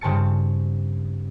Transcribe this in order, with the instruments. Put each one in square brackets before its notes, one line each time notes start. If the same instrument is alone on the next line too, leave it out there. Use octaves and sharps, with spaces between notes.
[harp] G2 C#3 C4 A5 A6 C#7